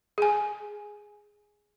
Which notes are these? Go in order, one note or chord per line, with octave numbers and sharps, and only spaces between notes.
G#4 G#5